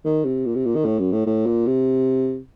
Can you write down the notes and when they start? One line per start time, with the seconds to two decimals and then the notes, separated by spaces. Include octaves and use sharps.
0.05 D#3
0.25 C3
0.46 A#2
0.55 C3
0.65 A#2
0.75 D#3
0.85 A2
0.99 F#2
1.12 A2
1.26 A2
1.46 A#2
1.67 C3